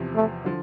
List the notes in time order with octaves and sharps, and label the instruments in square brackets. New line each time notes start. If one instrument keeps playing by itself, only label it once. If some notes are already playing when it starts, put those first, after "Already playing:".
Already playing: [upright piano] E2 C3 F3
[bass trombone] A3
[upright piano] D3 F3